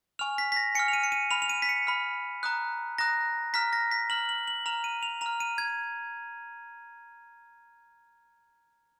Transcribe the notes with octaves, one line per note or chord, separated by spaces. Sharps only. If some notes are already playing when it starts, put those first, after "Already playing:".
G#5 C#6 F6 F7
B6
B6
A#6
G#5 C#6 F6 C#7
F7
D#7
C#7
D#7
B5 F6 F7
F7
D#7
B6
C#7
B5 F6
A#5 D#6 F#6
A#5 D#6 F#6 A#6
A#5 F6 B6
A#6
B6
A#5 F6 F#7
F#7
F#7
A#5 F6 F7
D#7
F7
A#5 F6 F7
D#7
G#6